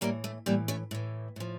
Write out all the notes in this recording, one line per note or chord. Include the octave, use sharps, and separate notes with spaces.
A2 E3 G3 A#3
A3
A2 E3 G3 A#3
A3 C#4
A2 E3
A2 F3